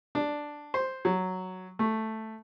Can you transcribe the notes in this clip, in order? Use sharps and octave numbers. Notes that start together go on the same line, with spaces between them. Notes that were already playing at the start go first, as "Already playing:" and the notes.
D4
C5
F#3
A3